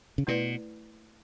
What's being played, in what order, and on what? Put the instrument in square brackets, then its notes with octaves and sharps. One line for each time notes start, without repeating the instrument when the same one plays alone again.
[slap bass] C#3
[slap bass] B2 [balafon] A3 E4 B4 D5